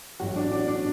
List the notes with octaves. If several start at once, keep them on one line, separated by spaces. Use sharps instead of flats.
A1 A2 F#3 F#4
D4
D4
D4